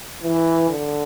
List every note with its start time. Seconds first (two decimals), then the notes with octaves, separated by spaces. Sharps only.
0.23 E3
0.69 D3